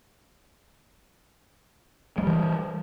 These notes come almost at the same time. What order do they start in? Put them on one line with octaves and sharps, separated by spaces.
G#3 G3 E3